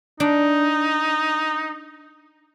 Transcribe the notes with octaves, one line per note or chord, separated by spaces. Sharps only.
D4 D#4